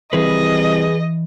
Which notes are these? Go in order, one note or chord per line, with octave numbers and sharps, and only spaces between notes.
C2 E3 G#4 B4 D#5